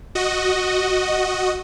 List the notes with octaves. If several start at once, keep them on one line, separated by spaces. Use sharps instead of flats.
F#4 D#5